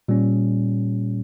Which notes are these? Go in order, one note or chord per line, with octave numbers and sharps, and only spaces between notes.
A#2 G3 C#4